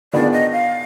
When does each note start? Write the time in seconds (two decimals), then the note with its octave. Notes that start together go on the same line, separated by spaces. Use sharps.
0.13 D#3 B3 D4 F4 G#4 D5
0.33 D#5
0.52 F5